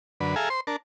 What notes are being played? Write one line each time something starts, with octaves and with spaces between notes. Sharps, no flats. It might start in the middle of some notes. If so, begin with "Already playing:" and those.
F#2 D3 B4
G#4 A4 E5 F5 G#5 A#5
C5 C6
D4 A#4 A5